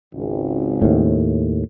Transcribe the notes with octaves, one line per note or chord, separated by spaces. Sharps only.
G#1 C#2
D#2 A2